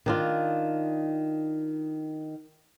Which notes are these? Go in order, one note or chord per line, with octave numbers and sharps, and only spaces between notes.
D#3 D4 F4